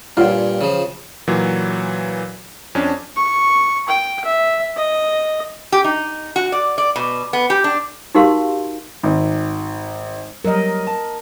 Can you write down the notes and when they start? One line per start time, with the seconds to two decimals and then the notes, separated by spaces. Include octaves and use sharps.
0.17 G2 A#2 F4 C#5 G5
0.61 C#3 F3
1.27 A#2 E3 F#3
2.75 F2 C#4 D4
3.16 C#6
3.89 G5
4.25 E5
4.77 D#5
5.72 G4
5.84 D#4
6.36 F#4
6.52 D5
6.78 D5
6.96 B2
7.33 B3
7.50 G4
7.64 D4
8.15 D#4 F#4 G4 A#4 F5 C6
9.03 G#1
10.45 F#3 G3 A#4 D#5
10.87 A5